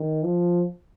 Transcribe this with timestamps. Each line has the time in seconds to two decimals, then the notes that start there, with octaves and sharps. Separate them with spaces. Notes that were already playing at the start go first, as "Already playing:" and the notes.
Already playing: D#3
0.24 F3